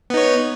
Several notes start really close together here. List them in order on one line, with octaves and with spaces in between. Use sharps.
B3 D#4 C#5